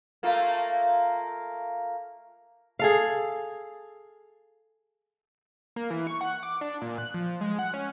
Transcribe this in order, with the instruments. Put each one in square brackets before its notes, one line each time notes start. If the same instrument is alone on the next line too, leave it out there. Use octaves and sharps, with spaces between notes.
[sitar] A3 A#3 F4
[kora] G#4 A4 F5
[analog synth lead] A#3
E3
C#6
F#5
D6
D4
A#2
F#6
F3
G#3
F#5
C#4